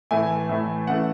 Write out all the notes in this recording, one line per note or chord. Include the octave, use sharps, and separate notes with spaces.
A2 E3 A3 G#5
A2 E3 A3
C#3 E3 A3 F#5